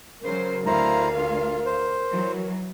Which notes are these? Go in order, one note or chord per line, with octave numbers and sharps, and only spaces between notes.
C#3 F#3 A#4 C5
D2 E4 C5 F5 A#5
F4
C5
E3 F#3